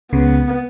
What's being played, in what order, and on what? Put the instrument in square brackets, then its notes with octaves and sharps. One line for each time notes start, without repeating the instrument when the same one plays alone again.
[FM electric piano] C#2 C#3 [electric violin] B3